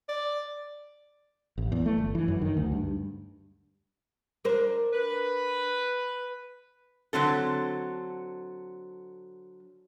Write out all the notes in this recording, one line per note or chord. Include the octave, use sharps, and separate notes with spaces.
D5
A1
E2
A3
G1
E3
F#2
D#3
D2
G2
D4 A#4 C5
B4
D3 F#3 C4 A4